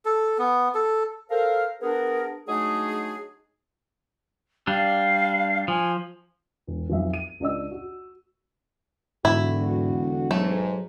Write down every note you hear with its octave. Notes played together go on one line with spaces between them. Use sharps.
A4
B3
A4
A4 A#4 C5 F5
B3 D4 G#4 A#4
F#3 G#3 A3 D4 D#4 G#4
G3 D4 F5
F3 G#5
E1
B1 F2 E5
D#7
C#2 D4 D5 D#5 E6
F#4
E1 G#2 D3 E4 F#4
B1 G#2 F#3 A3